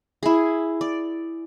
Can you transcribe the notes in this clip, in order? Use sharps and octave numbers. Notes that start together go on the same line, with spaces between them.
E4 G#4
D5